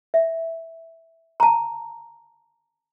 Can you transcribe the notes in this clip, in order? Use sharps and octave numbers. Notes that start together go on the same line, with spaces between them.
E5
A5 A#5